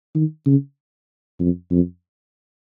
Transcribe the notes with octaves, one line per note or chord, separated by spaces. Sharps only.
D#3
C#3
F2
F2